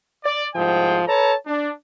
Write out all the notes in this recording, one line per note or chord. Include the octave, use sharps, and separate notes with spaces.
D5
C2 G#2 F3 G#4 G5
A4 B4 C#5 A5 A#5
D4